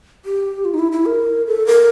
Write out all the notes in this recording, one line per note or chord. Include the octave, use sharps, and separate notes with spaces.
G4
F4
D#4
E4
E4
A#4
A4
A#4